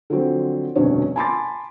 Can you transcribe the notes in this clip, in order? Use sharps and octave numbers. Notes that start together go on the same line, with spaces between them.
D3 F3 F#3 C4
F1 D2 G2 B2 C#4 C#5
G#5 A5 B5 C6 D6 A6